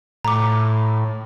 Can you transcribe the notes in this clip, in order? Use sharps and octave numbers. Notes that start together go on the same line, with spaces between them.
A2 A#5 D6